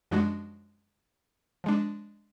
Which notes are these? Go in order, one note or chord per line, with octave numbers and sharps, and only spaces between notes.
F#2 F3 G#3 D4 F#4
F3 G#3 D4